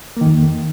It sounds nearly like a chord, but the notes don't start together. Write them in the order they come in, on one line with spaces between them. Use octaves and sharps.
A#3 D#3 F2